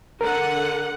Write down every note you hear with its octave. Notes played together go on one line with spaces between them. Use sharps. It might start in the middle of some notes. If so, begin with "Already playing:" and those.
D3 A#4 F#5